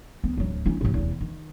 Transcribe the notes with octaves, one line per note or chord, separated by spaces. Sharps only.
B3
D1 F#3
C#4 E4
A1 A#2
F1 E2
D#3